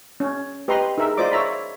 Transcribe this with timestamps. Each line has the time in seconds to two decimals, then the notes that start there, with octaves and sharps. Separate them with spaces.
0.20 C#4
0.68 G4 B4 D#5 A#5 C6
0.98 D#4 G#4 A#4 E5
1.17 F4 C5 D5 D#5 D6
1.31 C#5 E5 A#5 B5